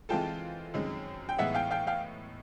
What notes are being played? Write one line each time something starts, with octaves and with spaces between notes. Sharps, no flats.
E3 G#3 C4 F4 A4 G5 A5
F#2 D#3 G#3 C4 D#4
G5
A2 E3 G#3 B3 D#4 E5 F#5
F5 G5
F5 G5
F5 G5